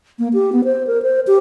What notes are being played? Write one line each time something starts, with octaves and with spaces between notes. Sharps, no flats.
A#3
G4
B3
C5
A#4
C5
G4